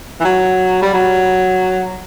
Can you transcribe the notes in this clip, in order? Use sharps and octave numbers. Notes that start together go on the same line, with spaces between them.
E3
F#3
G3
F#3